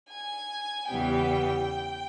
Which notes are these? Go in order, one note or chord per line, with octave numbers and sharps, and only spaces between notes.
G#5
E2 C#3 E3 G3 B3 G5